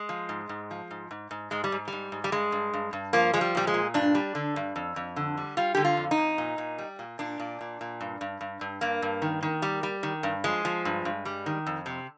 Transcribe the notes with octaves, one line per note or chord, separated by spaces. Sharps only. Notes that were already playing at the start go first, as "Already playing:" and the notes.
Already playing: G#3
F3
G#2
G#2
F3
G#2
G#2
G#2
G#2 G#3
G3
G#2
G#2 G3
G#2
G3
G2 G#3
G2
G2
G2
F3 A#3
F3 G#3
G3
A#2 G3
G#3
A#2
G2 D4
G3
D3
G2
F2
F2
D3
G3
G3 F4
D3 G4
F4
F2
D#4
F2
A#2
A#2
G3
A#2
A#2 D4
A#2
A#2
A#2
G2
G2
G2
G2
G2 A#3
G2
D#3
D#3
G3
G3
D#3
G2
F3 G#3
F3
G2
G2
G3
D#3
F2
C3